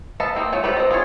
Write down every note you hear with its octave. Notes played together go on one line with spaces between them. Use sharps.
A4 B4 D#5 F5 A5
A#3 C4
F#3 A3 F4
C4 F4 G4 A4 B4
C4 D#5
F4 G#4 C#5